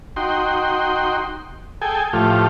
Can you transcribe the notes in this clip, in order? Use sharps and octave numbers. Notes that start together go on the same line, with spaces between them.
D#4 F#4 G5 C6
G#4 A4 G5 G#5
A2 F3 A3 F4 G4